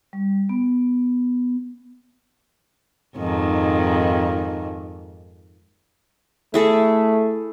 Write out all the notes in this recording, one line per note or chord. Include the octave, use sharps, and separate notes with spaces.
G3
B3
F2 G#2 D#3
A3 E4 G#4 A4